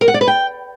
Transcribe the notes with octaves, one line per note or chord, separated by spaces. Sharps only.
A#4
F#5
D5
B4
G5